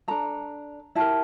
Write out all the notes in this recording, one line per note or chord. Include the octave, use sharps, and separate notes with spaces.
D4 A4 A#5
E4 G4 A#4 A5